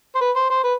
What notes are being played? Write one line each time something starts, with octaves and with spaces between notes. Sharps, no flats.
C5
B4
C5
C5
B4